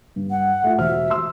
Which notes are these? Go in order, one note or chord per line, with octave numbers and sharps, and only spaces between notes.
G2
F#5
A3 F4
E1 C5 E5 F6
C6 E6